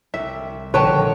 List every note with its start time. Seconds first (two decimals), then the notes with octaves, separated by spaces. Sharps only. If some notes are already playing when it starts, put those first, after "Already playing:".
0.14 C2 E5
0.74 A#1 D3 D#3 F3 B4 C#5 G5 A5